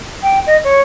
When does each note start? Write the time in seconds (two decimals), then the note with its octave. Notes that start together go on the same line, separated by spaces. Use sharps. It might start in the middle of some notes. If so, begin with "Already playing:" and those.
0.23 G5
0.47 D#5
0.64 C#5